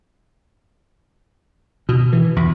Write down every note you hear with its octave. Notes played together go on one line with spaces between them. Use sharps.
B2
E3
E2